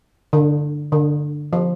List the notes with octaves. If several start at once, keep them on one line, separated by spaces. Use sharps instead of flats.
D3
D3
F3